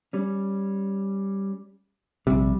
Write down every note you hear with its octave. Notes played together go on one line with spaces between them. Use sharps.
G3 C#4
A#1 C3 G3